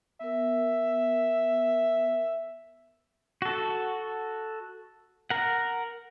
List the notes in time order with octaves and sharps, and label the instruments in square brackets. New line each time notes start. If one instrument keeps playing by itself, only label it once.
[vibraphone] B3 A#4 [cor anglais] E5
[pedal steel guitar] F#4 A4
A#4 F#5